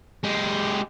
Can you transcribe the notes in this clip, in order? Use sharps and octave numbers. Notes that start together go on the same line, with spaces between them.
G#3 G4